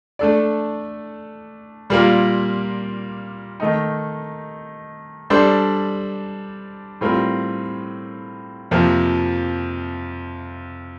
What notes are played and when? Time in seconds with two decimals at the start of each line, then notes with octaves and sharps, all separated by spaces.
0.19 A3 D4 A4 D5
1.90 A#2 G3 A#3 F4 A#4
3.60 D#3 A3 D#4
5.30 G3 D4 A4 C5
7.01 A2 G3 C4 F4 A#4
8.71 F2 C3 F3 A#3